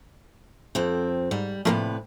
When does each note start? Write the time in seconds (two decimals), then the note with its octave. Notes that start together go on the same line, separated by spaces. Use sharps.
0.75 F2 C4
1.31 G#2 G3
1.65 A2 C3 F3 A3 A#3 B4